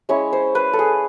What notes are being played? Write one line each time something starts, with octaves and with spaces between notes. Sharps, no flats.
G#3 C#4 E4 C#5
C5
B4
A4
G#4